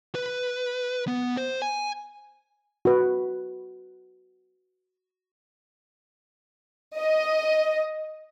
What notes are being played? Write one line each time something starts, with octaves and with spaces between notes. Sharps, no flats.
B4
B3
C5
G#5
F#4 B4
D#5